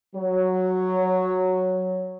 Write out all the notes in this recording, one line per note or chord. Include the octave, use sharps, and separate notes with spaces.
F#3 C#5